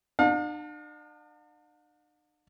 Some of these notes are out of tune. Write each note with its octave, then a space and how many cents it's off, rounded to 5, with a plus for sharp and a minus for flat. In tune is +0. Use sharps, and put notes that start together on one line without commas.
D4 +45 F5 +45 A5 +10